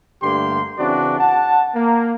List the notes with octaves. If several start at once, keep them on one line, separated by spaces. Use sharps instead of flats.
G2 D3 A3 A#3 G4 C6
C#3 E3 C4 D4 F#4 D5
F#5 A5
A#3